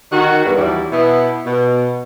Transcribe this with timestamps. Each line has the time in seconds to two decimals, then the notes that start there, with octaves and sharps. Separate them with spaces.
0.12 D#3 F#4
0.44 E2 G2
0.56 D#2 E3 F#3 G3 E4 D5
0.91 B2 B3 E4
1.46 B2